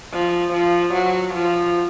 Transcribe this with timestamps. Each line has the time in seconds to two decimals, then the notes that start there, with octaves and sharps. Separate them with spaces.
0.13 F3
0.53 F3
0.94 F#3
1.34 F3